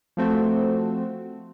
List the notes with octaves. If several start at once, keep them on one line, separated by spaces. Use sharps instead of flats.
F3 A3 C4 F#4